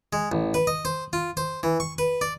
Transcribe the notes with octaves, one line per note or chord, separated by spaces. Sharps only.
G#3
A1
B4
D#5
C5
F4
C5
E3
C#6
B4
D5